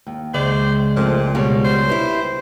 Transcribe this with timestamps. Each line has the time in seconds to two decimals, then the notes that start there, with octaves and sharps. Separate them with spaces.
0.07 D#2
0.34 C#2 G#3 C5 D5
0.96 A#2 F3 A3 C4
1.35 B2 G3 G#3 F4 C#5
1.64 C5
1.87 E4 G4 B4